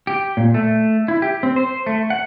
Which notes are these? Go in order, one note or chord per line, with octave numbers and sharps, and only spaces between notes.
G4
A#2
A3
E4
G4
C4
C5
A3
F#5